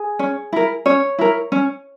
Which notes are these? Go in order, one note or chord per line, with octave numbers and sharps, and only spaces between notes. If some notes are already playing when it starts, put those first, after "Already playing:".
Already playing: G#4
C#4
E4 A#4
C#4 C#5
E4 A#4
C#4